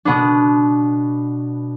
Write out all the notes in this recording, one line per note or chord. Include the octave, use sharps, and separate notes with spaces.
B2 B3 D4